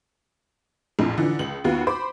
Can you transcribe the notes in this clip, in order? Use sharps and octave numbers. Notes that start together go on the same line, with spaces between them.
A#1 F2 A2
D3 E3 F3 D#4
C#2 F#7
D#2 B3 F4 F#4
C5 B5 D6